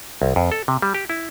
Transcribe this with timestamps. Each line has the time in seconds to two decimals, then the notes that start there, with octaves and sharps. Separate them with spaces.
0.22 C2
0.36 F2
0.52 A4
0.68 C3
0.82 G3
0.95 G4
1.10 E4